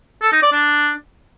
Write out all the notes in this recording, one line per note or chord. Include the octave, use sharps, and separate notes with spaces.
A4
D#4
D5
D4